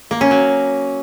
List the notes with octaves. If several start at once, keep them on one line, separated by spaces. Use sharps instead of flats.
A#3
C#4
F#3